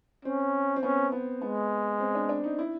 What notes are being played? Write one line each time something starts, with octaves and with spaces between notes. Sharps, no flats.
C4 C#4
C4
B3 C#4
B3
G#3 B3
C4
D4
D4
D#4
E4